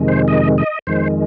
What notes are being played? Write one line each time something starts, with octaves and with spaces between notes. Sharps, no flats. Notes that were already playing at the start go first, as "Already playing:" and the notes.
Already playing: F2 C3 D#3 G#3
C5
D#5
D#5
F2 D#3 G#3 C5